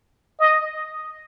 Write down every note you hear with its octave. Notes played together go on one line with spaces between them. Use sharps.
D#5